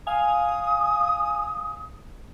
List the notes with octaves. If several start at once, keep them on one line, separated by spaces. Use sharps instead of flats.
F5 G#5 D#6